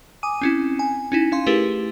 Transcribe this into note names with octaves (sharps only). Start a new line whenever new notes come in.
G#5 D6 D#6 D#7
C4 C#4 E4
G#5
C#4 D#4 E4
C#4 F5 C6
A3 E4 G4 G#4 A#4 B4